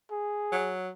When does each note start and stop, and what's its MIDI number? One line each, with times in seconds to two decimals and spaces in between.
0.11 0.76 68
0.52 0.90 54